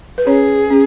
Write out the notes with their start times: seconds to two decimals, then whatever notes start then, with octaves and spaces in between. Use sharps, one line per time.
0.18 B4
0.27 C#4 G#4 C#5
0.70 C#4